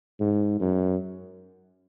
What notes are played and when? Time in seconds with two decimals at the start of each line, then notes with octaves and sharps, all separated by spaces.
0.20 G#2
0.60 F#2